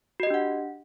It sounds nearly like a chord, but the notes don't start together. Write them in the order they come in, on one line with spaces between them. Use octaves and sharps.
F#4 D#5 G4 D4 F#5